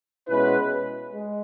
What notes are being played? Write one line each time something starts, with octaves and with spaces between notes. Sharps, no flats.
B2 G#3 C#4 E4 B4
G#3